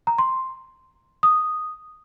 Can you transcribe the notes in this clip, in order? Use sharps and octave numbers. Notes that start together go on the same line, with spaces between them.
A#5
C6
D#6